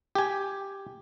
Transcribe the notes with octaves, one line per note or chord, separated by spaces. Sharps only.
G4 G#5